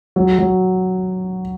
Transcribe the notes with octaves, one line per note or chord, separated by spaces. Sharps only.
F#3
F#3